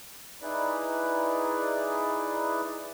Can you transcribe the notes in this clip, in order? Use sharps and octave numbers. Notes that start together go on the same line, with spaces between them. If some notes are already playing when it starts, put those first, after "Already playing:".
D#4 E4 G#4 B4 D5